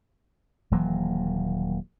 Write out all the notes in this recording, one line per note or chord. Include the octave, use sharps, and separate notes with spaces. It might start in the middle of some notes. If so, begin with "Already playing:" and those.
D#1 E3 F#3 A#3